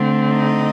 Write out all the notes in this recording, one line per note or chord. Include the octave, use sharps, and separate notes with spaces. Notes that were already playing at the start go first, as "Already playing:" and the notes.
Already playing: D3 A3 C4
D#4 D#5